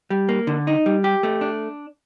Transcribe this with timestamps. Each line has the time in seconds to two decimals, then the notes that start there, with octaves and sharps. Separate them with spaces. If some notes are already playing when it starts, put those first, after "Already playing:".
0.10 G3
0.29 A#3
0.47 D3
0.67 D#4
0.86 G3
1.04 G4
1.23 A3
1.41 D4